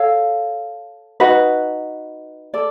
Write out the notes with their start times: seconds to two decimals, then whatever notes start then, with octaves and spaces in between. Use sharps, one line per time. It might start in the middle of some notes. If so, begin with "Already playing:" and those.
Already playing: A4 C#5 F5
1.20 D#4 F#4 B4
2.54 A4 D5